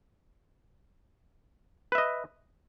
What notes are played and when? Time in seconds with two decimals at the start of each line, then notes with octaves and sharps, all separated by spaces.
1.92 B4
1.95 E5
1.98 D#5